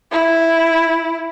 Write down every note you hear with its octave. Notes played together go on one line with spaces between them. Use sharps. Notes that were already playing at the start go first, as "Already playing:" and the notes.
E4